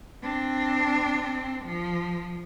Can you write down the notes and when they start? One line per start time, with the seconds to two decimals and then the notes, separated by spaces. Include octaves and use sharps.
0.23 C4 D4
1.65 F3